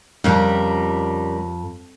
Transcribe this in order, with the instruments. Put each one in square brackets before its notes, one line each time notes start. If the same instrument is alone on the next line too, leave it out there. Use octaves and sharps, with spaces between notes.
[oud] F2 [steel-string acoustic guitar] C#3 G3 A#4